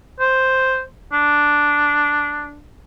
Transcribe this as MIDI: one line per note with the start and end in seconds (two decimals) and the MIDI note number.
0.20 0.81 72
1.13 2.61 62